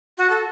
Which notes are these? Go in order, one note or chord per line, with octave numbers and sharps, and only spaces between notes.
F#4
A4